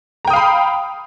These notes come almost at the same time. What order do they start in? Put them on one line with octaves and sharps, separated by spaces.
A#5 G5 D#6 F5 B5